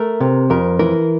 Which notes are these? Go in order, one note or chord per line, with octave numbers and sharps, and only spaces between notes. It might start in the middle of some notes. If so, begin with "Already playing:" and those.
Already playing: A3 A#4
C3
F2 A#4
E3 A#4